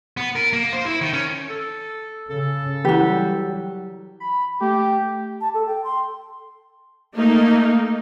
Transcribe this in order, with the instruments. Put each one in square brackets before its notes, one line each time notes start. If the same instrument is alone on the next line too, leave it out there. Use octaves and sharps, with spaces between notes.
[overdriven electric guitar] B3
A#4
A#3
C5
E4
D#3
C#4
[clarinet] A4
[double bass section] C#3 [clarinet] A4
[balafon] E3 E4 [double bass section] F#3 G3 [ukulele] F#4 G4
[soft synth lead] B5
[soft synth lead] A3 [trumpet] G4
[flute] A5
A4
G5
C6
[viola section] A3 A#3 D#4